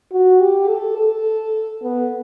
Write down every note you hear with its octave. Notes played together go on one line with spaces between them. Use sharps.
F#4
G4
A4
A4
B3